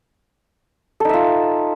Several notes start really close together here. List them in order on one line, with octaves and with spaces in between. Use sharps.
A4 D#4 E5 F4